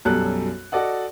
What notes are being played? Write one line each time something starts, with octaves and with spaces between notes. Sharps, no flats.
B1 F#2 G3 A4 F#6
F#4 A4 D5 D#5 F#5